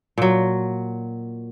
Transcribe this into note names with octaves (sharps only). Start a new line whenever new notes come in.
A#2 F#3